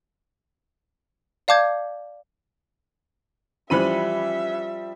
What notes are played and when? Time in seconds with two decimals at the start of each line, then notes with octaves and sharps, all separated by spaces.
1.48 D5 F5 A5 D6 G6 G#6
3.70 E3 F3 G3 C#4 C5 E5 B5 D#7